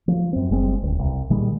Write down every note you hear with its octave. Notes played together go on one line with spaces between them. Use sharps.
F3
F#2 C4
F#1 G3 G#3 C4
D1 C#2
C2
A#2 D#3 G3 G#3